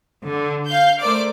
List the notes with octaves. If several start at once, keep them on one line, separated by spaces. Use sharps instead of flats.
D3
F5 G6
A3 A#4 C5 D5 D6